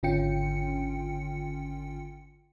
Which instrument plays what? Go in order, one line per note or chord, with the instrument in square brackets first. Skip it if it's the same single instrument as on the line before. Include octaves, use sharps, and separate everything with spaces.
[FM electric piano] G#1 D3 C#4 F4 G5 C#7